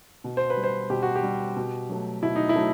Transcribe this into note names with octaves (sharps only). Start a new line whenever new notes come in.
B2
C5
B4
G3
C5
B2 G4
F#4
G4
G3
B2
F#3 A3
B2 E4
D#4
E4
F#3 A3